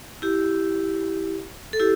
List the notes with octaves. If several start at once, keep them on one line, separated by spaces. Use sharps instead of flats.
E4 G4
A4
E4 G4